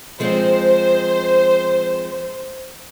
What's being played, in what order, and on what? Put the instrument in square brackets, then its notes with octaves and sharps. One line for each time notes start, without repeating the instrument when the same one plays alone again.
[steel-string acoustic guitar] F3 G#3 C4 [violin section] C5